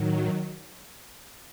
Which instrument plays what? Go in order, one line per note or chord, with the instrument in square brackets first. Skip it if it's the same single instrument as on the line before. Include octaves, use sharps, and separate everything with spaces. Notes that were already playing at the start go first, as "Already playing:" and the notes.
Already playing: [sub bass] A2 [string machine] D#3 F#3